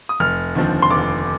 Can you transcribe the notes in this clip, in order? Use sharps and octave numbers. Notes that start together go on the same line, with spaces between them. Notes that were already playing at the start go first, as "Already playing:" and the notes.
D#6
F1 F6
D#2 D3 F3 C4
C6
F1 D6